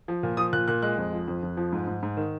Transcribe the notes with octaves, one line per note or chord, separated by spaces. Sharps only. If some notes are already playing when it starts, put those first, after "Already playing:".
F3
A#2
F3 D#6
A#2 F#6
A#2 F#6
G#3 F#6
F2
F3
F2
F2
F3
G#2
G#2
G#2
D#3